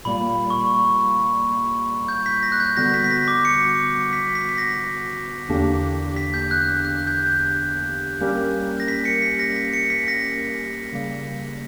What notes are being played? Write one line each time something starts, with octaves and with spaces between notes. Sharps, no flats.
A#2 G3 A#3 B5
C#6
G6
B6
A#6
F#6
G6
D3 G3 B3 F#4 A#6
B6
B6
A#6
D6
C#7
B6
B6
B6
A#6
E2 D3 A#3 D4 G4
B6
G6
F#6
F#6
F#6
G6
G3 A#3 C#4 G4 A#4
A#6
B6
C#7
B6
A#6
B6
C#7
B6
A#6
C#3 G3 A#3